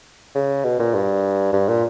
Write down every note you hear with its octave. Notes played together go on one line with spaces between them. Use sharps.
C#3
B2
A#2
G2
G2
A#2